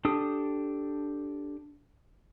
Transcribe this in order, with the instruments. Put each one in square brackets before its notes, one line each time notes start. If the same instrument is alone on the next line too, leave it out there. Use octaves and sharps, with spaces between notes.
[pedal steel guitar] D4 G4 A4 D#6